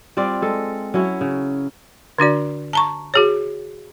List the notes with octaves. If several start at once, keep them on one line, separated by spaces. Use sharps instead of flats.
G3 C4 F4 D5
G#3 A4
F#3 C#4 E4
C#3
D3 D4 F#4 D5
A5 A#5 C#6
F#4 G#4 C#5